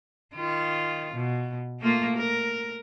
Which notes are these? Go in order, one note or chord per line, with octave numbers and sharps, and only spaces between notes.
D#3 F4
B2
A3 A#3 F4
A#4